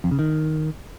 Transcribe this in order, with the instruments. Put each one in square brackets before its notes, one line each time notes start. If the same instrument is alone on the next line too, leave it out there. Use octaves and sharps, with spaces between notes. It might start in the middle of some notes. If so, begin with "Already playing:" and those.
[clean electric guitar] F2
C#3
D#3